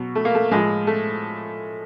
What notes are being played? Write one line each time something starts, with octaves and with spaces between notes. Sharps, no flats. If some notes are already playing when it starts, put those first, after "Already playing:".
Already playing: B2 F#3
A3
A#3
A3
A2 F3 G#3
A3